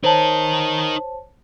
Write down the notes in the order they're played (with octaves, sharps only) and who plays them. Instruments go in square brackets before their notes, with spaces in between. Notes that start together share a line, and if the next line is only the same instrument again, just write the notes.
[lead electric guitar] D#4 A#4 [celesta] C5 C#5 A5